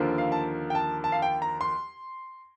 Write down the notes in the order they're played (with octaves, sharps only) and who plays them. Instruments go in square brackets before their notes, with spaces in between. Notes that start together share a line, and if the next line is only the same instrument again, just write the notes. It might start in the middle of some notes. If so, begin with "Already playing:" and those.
Already playing: [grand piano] D#2 D3 F3 A#3
F5
A5
G5
A5
A5
F5
G5
A#5
C6